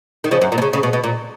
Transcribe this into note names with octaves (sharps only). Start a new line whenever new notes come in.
D#3
C#3 F3
F#2
A#2
B2
C#3
C#3
B2
B2
A#2